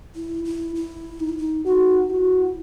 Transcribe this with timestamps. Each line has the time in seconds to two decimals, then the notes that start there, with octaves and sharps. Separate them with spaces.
0.16 E4
0.45 E4
0.75 E4
1.20 D#4
1.29 E4
1.38 D#4
1.65 D#4 F#4
2.10 E4 F#4